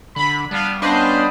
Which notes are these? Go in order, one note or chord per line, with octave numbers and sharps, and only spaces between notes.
D3 B5
G3 B3 D4 F5
B3 C#4 D4 B4 C5 D#5 F5